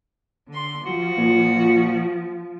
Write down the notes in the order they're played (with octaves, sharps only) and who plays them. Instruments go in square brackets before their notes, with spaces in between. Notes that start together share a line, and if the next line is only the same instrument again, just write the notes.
[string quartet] D3 C6
[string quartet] F3 [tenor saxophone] F#4
[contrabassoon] A#2